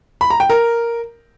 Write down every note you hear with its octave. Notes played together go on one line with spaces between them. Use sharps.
B5
A#5
G5
A#4